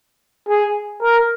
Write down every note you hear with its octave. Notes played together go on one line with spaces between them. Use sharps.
G#4
A#4